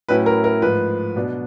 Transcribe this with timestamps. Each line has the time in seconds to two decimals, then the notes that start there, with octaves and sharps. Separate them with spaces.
0.09 A2 F#3 A3 C#4 E4 B4
0.26 A#4
0.44 A#4
0.62 G#2 F3 A3 B4
1.16 B2 F#3 B3 D4